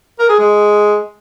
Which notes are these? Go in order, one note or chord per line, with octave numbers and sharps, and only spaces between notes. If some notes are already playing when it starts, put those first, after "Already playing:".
A#4
G#4
G#3